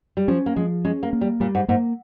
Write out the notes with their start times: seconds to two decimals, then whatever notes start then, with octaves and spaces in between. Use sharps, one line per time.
0.17 G3
0.28 F3 C#4
0.46 A#3
0.56 F3 G#3
0.85 G#3 C#4
1.03 A#3
1.13 A#3
1.21 G3
1.40 A#2 G3
1.55 G#2
1.68 G#2 A#3